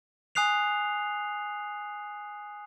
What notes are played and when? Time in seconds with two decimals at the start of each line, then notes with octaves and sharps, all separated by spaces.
0.35 G#5 D#6 F#6 C7 F7